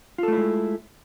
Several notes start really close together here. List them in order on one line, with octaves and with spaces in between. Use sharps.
F4 A4 A3 E4 G#3